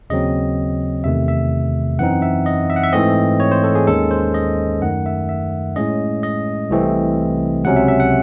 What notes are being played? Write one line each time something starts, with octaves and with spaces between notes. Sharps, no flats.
D#2 C#3 F#3 C4 D#5
E2 C3 D#3 A3 E5
E5
F#2 E3 C4 D#4 F#5
E5
D#5
E5
F#5
E5
G#2 E3 A3 C4 D#5
C#5
C5
A4
G#4
D#2 D#3 G#3 C#4 A4
C5
D#5
F#2 D#3 A3 F#5
E5
E5
A2 G#3 C#4 D#5
D#5
C2 C3 E3 A3 C4
C#2 C3 F#3 C#4 F#5
E5
E5
F#5